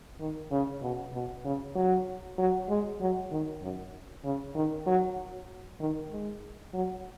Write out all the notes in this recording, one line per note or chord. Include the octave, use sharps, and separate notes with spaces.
D#3
C#3
B2
B2
C#3
F#3
F#3
G#3
F#3
D#3
F#2
C#3
D#3
F#3
D#3
G#3
F#3